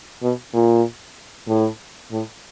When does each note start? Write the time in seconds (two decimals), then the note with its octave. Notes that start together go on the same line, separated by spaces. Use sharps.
0.22 B2
0.54 A#2
1.48 A2
2.11 A2